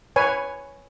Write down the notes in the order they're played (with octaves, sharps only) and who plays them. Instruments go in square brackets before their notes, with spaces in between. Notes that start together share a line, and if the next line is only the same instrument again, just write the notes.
[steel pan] B4 C#5 G#5